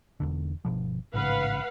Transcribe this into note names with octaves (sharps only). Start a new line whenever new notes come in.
E1 E2 D3
G1 B2 F3
A1 G#2 C#3 B4 F5 F#5